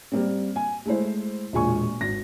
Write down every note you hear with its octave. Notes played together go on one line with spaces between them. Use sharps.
G3 A#3 C4
G#5
G#3 A3 E4 C5
E1 A#2 G#3 G#5 C#6
G#1 A#6